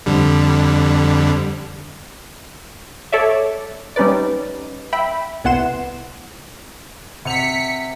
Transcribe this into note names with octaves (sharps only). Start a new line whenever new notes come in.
F2 D3 G3
A4 C#5 D5 E5
G3 C#4 D#4 B4 D5
E5 G5 B5
C2 B3 E4 F#5 C6 E7
C3 F#5 B6 C#7 F7